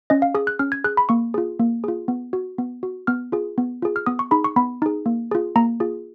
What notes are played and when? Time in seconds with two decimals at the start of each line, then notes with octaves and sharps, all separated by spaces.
0.10 C#4 D#5
0.22 F5
0.35 G#4 D#6
0.47 F#6
0.59 C#4 F6
0.72 G#6
0.84 G#4 F#6
0.97 B5
1.09 A#3 C#6
1.34 F4 G#4
1.60 A#3
1.84 F4 G#4
2.08 B3
2.33 F#4
2.58 B3
2.83 F#4
3.07 B3 F6
3.32 F4 G#4
3.58 B3
3.82 F4 G#4
3.96 F6
4.06 B3 D#6
4.19 C#6
4.31 D#4 G#4 B5
4.44 C#6
4.56 B3 B5
4.82 D#4 G#4
5.06 A#3
5.31 F4 G#4
5.56 A#3 A#5
5.80 F4 G#4